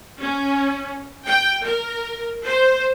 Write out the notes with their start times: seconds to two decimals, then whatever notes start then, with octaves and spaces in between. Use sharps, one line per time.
0.19 C#4
1.28 G5
1.64 A#4
2.45 C5